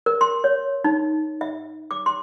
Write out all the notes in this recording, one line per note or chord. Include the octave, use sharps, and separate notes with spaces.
A#4
C6
C#5
D#4
E5
D6
C6